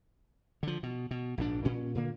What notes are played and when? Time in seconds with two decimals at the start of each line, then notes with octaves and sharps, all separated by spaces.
0.63 D3 F3
0.83 B2
1.11 B2
1.38 A#1 G#2 D4
1.65 A#2 C#4
1.95 A#2 D3 A#3